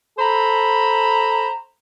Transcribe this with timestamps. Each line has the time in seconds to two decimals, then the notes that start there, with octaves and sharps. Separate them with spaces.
0.19 A4 C5 A#5 B5